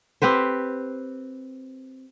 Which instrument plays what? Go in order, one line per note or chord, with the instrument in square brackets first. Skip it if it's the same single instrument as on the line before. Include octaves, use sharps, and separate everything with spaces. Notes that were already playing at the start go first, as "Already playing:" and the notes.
[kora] C4 G4 B4 C5